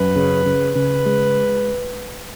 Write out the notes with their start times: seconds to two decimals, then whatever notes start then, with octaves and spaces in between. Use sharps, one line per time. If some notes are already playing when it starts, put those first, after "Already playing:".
Already playing: F#2 B4
0.16 C#3
0.46 C#3
0.75 C#3 B4
1.06 G#3